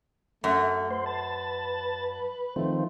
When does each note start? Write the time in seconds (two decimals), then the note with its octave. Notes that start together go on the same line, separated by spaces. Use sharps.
0.44 F#2 A3
0.91 B4 C5
1.06 A5
2.56 D#3 F3 A3 C4